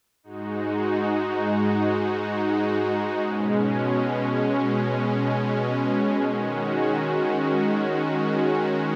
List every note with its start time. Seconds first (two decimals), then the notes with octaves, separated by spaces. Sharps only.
0.23 G#2 G#3 D#4 F#4
3.21 B2 G#3 C#4
6.19 D#3 G#3 C#4 F#4